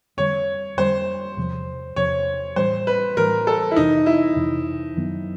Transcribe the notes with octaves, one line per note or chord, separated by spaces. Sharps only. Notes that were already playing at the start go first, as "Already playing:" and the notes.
F2 D3 G3 C#5
F2 D3 G3 C5
E2 C3 F3
E2 C3 F3 C#5
A2 E3 G3 C5
B4
A2 E3 G3 A#4
A4
E4
F2 C3 E3 D#4
E4
F2 C3 E3
F#2 D#3 F#3 B3